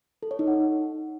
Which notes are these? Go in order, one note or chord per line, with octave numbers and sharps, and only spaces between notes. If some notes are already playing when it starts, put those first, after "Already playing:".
A4
C#5
D#4
F#5